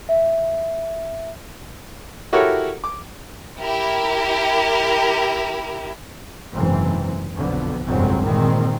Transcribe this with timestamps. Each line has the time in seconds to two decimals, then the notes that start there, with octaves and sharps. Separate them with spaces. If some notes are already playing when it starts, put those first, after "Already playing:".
0.09 E5
2.33 E4 F#4 G4 A4 A#4 C#5
2.84 D6
3.61 E4 G4 A#4
6.53 F#1 G#2 C3 E3 C4
7.35 B1 F2 D3 B3
7.86 G1 C2 F2 F#3 G#3 C4
8.25 A#2 D#3 E3 G#3 C4